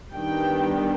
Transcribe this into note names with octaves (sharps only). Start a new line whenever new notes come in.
D#3 G3 B3 D4 G5